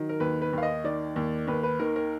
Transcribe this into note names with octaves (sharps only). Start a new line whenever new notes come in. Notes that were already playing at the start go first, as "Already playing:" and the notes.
Already playing: D#3 F#3
A#4
D#2 B4
B4
D#2 F5
D#5
D#3 D5
D#2
D#2 B4
B4
D#3 A#4
A#4